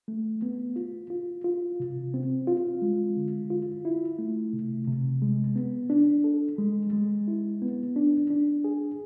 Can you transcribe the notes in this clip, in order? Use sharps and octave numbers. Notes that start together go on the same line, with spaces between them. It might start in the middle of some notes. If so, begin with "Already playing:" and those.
A3
B3
F4
F4
F4
C3
C4
F4
G#3
D3
F4
E4
A3
C3
C3
G#3
B3
D4
A4
G#3
G#3
E4
B3
D4
D4
G#4